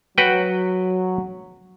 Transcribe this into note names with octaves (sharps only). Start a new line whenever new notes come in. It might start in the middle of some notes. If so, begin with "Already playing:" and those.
F#3 F#4 B4 G5